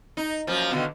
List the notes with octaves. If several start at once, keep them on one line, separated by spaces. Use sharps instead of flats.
D#4
F#2 F3 A#3
B2 D3 D#3